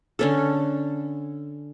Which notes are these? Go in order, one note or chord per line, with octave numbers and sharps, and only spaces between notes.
D3 C#4 A4